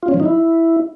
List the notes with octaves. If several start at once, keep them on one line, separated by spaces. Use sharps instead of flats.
F4
C#4
F3
D#4
E4